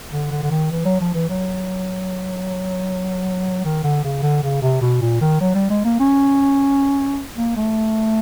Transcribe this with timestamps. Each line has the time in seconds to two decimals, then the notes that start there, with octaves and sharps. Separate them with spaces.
0.12 D3
0.31 D3
0.42 D3
0.51 D#3
0.71 E3
0.85 F#3
1.00 F3
1.14 E3
1.29 F#3
3.65 D#3
3.84 D3
4.04 C#3
4.23 D3
4.43 C#3
4.62 C3
4.82 B2
5.01 A#2
5.21 D#3
5.40 F#3
5.55 G3
5.70 G#3
5.85 A#3
6.00 C#4
7.36 A#3
7.56 A3